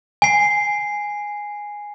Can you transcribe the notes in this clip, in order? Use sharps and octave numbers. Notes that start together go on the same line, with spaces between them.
G#5 C7